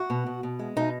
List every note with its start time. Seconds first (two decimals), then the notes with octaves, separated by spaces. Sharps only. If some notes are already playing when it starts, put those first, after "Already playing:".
Already playing: F#4
0.10 B2
0.26 B2
0.43 B2
0.59 G#3
0.76 B2 D#4